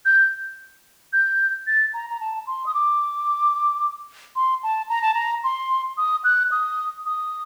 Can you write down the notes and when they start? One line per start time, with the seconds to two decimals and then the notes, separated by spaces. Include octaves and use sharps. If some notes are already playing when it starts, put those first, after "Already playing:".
0.05 G6
1.13 G6
1.67 A6
1.94 A#5
2.10 A#5
2.21 A5
2.47 C6
2.66 D#6
2.74 D6
4.36 C6
4.63 A5
4.89 A#5
5.02 A5
5.14 A#5
5.44 C6
5.98 D#6
6.24 F#6
6.52 D#6
7.06 D#6